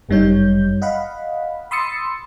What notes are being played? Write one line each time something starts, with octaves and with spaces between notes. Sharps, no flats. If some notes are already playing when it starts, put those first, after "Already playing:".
G1 F#2 G3 D#4 C#5 G6
D#5 F5 F#5 B5
B5 C6 D#6 E6 A6 C#7